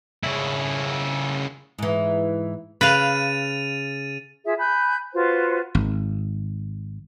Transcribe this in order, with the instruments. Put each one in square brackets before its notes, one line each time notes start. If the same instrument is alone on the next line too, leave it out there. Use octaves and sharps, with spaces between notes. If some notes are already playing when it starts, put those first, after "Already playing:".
[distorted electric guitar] C#3 E4
[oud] G#2 E3
[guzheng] C#3 F5 [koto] B4 [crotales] A6 D#7 F7
[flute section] F4 G#4 E5
G#5 B5 F#6 G6
F4 F#4 B4 C5
[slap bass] G#1